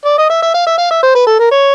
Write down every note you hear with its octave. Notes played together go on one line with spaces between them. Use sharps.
D5
D#5
E5
E5
F5
E5
F5
E5
C5
B4
A4
A#4
C#5